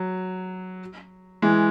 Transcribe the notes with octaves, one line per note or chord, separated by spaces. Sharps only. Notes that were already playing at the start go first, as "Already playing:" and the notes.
Already playing: F#3
E3 G#3